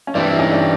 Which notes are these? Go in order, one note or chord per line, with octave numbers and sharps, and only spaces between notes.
C#4
G2 E3 G3 C4 D4
E4
C#4 D#4
D4